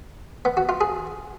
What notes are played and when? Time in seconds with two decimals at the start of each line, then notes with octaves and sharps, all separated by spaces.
0.45 B3
0.57 F#4
0.69 F4
0.81 G#4